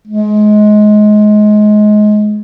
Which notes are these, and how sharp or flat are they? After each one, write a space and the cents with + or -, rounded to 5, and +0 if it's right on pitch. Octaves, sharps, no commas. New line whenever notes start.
G#3 +25